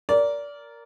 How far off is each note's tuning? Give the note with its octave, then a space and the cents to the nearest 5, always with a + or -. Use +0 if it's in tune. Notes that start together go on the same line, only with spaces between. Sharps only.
A#4 +0 D5 -20